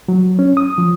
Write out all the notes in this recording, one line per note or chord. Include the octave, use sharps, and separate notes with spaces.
F#3
C#4
D#6
F3